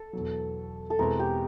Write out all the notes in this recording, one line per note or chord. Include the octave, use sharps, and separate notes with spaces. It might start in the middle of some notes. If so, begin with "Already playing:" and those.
Already playing: A4
E2 B2 F#3
A4
E2 B2 G#3 C4 E4 A#4
G4